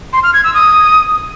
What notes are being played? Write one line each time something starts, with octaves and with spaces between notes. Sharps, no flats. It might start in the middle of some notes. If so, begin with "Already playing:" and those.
C6
F6
G#6
E6
D#6